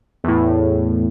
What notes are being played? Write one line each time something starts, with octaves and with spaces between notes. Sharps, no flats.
E2 A2